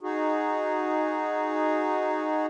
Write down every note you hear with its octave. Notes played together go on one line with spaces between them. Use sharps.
D#4 F#4 G#4